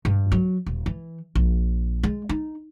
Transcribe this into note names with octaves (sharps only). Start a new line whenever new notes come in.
G2
F#3
D#1
E3
A#1
G#3
D#4